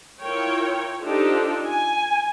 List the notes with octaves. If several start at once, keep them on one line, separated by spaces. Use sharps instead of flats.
E4 F4 A#4 C#5 G5
D4 D#4 F4 G4 A4 C5
G#5